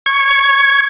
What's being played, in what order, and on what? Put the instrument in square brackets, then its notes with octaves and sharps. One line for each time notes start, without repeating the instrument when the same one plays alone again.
[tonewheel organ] C#6 G#6